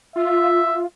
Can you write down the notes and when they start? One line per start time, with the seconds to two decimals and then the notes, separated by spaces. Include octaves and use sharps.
0.16 F4 E5